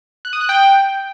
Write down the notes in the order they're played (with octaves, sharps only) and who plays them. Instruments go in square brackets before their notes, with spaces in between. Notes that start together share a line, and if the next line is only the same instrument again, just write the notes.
[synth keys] F#6
D#6
F#6
G5